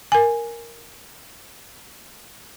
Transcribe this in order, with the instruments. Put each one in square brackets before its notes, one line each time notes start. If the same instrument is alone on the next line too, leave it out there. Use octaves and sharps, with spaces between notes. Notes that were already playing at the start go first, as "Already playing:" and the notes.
[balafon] A#4 G#5